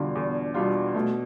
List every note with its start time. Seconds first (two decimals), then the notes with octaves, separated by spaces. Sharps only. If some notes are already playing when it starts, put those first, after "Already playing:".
Already playing: E2 B2 D3 G3 D4 F4
0.15 E2
0.54 B2 G3 D4 F4
0.95 B2 A3